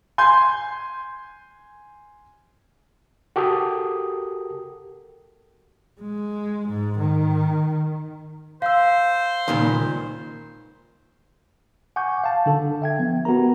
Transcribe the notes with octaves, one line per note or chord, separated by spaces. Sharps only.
G#5 C6 G6
F#4 G4 A4 A#4 D#6
G#3
G#2
D#3
C5 F5 E6
C#2 A#2 D#3
F#5 G#5 C#6 D6 G6
F5 A5
D3 D4 A4
E5 G5 G#6
F3 B3
B3 F#4 G4 A#4 A#5